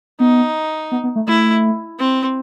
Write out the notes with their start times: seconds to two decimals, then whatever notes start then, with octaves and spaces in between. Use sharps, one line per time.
0.20 B3 D#4
0.92 B3
1.04 B3
1.16 A3
1.28 A3 E4
1.99 C4